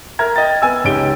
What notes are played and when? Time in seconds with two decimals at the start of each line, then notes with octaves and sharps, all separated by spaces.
0.19 A#4 E5 A#5 F6 G#6
0.36 D#5 G5 A6
0.62 B3 G#5 E6
0.84 C#2 G#2 C#4 G4 D7 G7